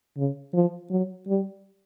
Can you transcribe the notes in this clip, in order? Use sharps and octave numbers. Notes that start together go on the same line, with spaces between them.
C#3
F3
F#3
G3